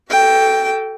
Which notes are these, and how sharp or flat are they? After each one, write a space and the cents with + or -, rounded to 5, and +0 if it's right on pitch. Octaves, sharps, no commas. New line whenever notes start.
F#4 +40 A4 +0 G5 +0